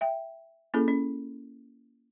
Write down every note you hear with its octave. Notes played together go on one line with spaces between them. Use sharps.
E5 G5
A#3 C#4 E4 G#4 A4
C#4